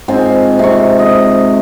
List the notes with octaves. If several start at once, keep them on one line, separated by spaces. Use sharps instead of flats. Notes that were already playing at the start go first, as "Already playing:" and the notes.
G#2 C4 F4 G#5
C3 C#6
D#5